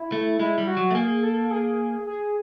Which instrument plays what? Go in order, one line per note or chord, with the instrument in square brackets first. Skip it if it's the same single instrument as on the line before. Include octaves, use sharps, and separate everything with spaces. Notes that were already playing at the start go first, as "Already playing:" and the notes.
Already playing: [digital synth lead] E4
[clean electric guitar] A3
[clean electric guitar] G#3 [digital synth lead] E4
[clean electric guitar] G3
[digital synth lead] F#4
[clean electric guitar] F#3
A3
[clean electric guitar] A#3 [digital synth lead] G#4
[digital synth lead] A4
G#4
G#4